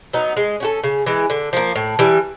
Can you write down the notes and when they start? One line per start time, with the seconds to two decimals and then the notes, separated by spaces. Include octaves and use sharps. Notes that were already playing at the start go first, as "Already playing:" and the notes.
0.13 F#3 B3 D#4
0.37 G#3
0.60 C#4 F#4 A4
0.83 C#3
1.06 E3 G#3
1.30 D3
1.53 F3 A#3
1.76 A2
1.99 E3 G3